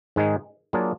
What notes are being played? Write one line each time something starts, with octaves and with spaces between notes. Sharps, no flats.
G#2 D#3 G#3 D#4 G#4
F#3 A#3 D4 F4 G#4